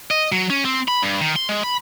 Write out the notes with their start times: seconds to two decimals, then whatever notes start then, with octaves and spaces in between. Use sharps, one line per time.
0.11 D#5
0.32 F#3
0.50 C#4
0.65 C4
0.88 B5
1.03 G2
1.21 D#3
1.36 C6
1.49 G#3
1.64 B5